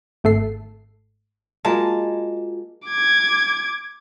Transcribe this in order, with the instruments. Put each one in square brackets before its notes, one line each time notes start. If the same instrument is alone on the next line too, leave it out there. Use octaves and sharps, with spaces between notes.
[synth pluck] G#1 A3 A4 C7
[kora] G#3 A#3 [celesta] F4 F#4 D#5 [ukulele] A5
[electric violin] D6 G#6